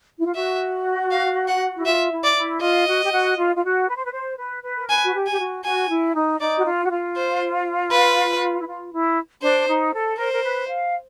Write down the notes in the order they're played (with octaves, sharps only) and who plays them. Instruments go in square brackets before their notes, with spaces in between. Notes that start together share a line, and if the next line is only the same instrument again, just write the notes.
[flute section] E4
F4
[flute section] F#4 [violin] E5
[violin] F5
F#5
[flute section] E4
[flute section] F4 [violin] E5
[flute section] E4
[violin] D5
[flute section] E4
[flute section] F4 [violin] D#5
[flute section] F#4
G4
F#4
F4
F4
F#4
B4
C5
B4
C5
B4
B4
A#4
[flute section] B4 [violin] G#5
[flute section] F#4
G4
[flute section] G4 [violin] G#5
[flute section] F#4
[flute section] F#4 [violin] G#5
[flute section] E4
D#4
[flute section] D#4 [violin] D5
[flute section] F#4
F4
F#4
F4
[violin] C5
B4
[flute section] E4
F4
E4
[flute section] D4 [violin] C5
[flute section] D#4
A4
[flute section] A#4 [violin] C5
[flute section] A#4
B4
F5